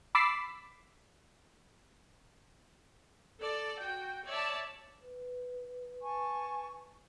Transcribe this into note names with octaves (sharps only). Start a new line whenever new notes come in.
B5 D6 E6 A6 B6 C7
A4 D5
F#4 G5
C#5 D5 E5 A5
B4
G#5 A5 C#6